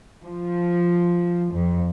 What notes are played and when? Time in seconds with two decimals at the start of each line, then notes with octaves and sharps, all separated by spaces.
0.24 F3
1.54 F2